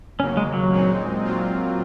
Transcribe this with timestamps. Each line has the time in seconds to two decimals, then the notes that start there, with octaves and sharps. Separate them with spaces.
0.19 D#2 C#3 F#3 A#3 C#4
0.37 G#3
0.53 F#3
0.71 A#2 G#3 C4 D#4
1.24 A#2 F#3 C4 F4